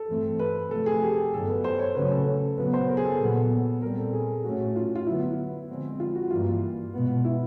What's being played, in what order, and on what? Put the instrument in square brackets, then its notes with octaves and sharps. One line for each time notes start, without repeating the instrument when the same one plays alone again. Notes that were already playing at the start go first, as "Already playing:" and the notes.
Already playing: [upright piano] A4
[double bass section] G2 E3 A3 C4
[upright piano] B4
[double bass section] C3 F3 A3 [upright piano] A4
[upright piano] G#4
G4
[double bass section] G2 D#3 F#3 B3 [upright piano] A4
[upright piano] B4
C5
C#5
[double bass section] C#3 F#3 A3 C#4 [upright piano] B4
[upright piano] A4
[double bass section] C#3 F#3 B3 [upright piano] B4
[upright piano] C5
A#4
G#4
A4
[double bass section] A#2 F#3 B3
[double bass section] A#2 G3 C4 [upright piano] A#4
[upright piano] A4
G#4
[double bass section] A2 F#3 A3 C#4 [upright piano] F#4
[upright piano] F4
F4
[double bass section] D3 F#3 B3 [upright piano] E4
[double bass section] D3 F3 G#3 C4
[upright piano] F4
F#4
[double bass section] G2 E3 G3 A#3 [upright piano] F4
[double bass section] B2 G#3 B3
[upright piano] E4